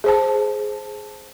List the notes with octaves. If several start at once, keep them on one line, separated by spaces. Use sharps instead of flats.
G#4 C5 A5